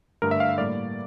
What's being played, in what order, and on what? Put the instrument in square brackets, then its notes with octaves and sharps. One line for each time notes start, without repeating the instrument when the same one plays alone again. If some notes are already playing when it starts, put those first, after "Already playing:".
[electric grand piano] G2 D3 A3 A#4
E5
F5
E5
A2 G3 A#3 D5